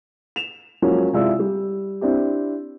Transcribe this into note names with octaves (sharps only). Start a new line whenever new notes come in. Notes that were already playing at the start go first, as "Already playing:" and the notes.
E7 F7
F3 F#3 G#3 A#3 C#4
C3 G#3 E4 F4 D5 E6
G3
C4 D4 E4 G4